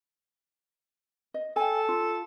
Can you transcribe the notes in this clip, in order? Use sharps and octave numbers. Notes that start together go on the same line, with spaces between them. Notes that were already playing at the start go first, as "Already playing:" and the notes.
D#5
A4 G5 G#5
F4